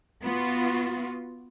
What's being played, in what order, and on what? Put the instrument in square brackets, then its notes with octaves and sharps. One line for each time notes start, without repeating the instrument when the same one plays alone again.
[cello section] B3 F4 F#4